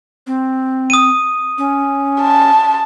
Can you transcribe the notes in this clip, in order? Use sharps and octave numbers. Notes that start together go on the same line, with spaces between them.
C4
D#6 D#7
C#4
A5